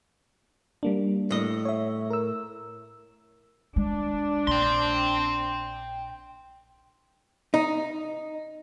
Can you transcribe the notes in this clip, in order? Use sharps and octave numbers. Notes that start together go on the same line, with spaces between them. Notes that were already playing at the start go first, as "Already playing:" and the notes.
G3 A#3 D4
A2 D#5
C#5 E5
A#4 E6
G#3 D4
A#1 G5 C6
D#4